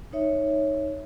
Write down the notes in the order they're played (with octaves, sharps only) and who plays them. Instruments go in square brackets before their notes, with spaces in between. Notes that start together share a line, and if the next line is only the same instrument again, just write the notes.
[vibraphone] D#4 C#5 E5